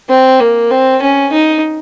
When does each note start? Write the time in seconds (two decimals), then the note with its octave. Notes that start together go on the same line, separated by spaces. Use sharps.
0.09 C4
0.40 A#3
0.71 C4
1.02 C#4
1.32 D#4